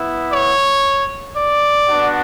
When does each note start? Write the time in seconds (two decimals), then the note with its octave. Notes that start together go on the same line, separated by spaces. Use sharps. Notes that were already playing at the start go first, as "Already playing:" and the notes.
Already playing: B3 E4
0.31 C#5
1.36 D5
1.87 B3 D4 F#4